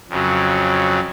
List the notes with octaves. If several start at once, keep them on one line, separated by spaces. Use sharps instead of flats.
F2 C#3 F#3